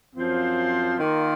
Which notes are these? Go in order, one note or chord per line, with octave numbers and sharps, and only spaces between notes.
F#2 F3 C4 F4 C5
D#3 A#3 F4